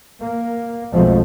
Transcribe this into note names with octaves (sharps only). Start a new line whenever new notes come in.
A#3
B1 F2 B2 F3 G#3 A3